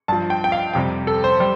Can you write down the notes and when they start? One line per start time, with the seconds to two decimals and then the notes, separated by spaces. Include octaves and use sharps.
0.08 G2 F3 A5
0.30 G5
0.44 G5
0.52 F5
0.73 F2 C3 G3 G5
1.07 A4
1.24 C5
1.40 G3